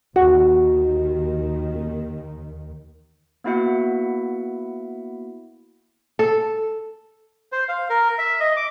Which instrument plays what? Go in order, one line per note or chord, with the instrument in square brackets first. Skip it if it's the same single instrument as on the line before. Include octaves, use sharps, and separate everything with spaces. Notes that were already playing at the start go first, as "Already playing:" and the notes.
[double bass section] D#2 D#3 [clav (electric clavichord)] F#4
[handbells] A#3 B3 E4 F#4 E5 F#5
[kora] A4
[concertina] C5
F5
A#4
E5
D#5
D6